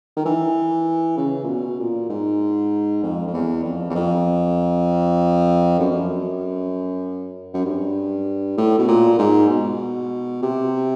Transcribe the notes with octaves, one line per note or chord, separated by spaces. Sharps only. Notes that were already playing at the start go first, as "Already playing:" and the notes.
D#3
E3
C#3
A#2
B2
A#2
G#2
F2
F2
E2
F2
E2
F2
F#2
F2
F#2
F#2
G2
A2
B2
A#2
G#2
B2
C3